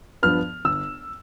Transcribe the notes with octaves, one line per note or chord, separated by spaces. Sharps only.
G2 F3 B3 F6
G1 E6